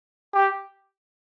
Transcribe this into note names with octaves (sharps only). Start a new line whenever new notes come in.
G4